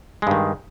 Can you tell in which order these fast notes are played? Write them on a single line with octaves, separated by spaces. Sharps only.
G#3 G2 D#3